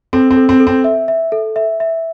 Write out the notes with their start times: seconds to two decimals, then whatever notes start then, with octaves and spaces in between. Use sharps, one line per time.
0.13 C4 A4
0.31 C4
0.37 A4
0.49 C4
0.60 A4
0.67 C4
0.84 E5
1.08 E5
1.32 A4
1.56 E5
1.80 E5